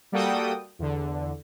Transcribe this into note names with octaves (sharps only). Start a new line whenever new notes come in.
G3 A#3 F#4 A4 G5 D#6
E2 D3